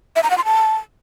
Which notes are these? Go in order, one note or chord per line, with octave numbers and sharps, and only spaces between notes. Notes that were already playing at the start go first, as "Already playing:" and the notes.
E5
A#5
F#5
C6
A5